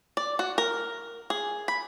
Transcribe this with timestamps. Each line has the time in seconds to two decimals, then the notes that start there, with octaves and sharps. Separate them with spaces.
0.17 D5
0.39 F#4
0.58 A#4
1.30 G#4
1.68 B5